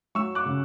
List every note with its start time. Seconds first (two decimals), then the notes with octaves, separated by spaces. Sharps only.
0.15 F#3 C#6 E6
0.35 D6 F#6
0.45 C#3